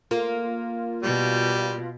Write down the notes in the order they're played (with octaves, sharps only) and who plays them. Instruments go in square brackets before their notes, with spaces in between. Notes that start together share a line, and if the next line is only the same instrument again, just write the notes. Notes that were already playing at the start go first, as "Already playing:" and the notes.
[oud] A#3 [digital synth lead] F4
[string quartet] B2 [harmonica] G3